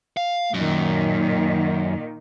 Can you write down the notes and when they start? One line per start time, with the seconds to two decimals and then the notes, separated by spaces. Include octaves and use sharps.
0.17 F5
0.54 F#2 A#2 D#3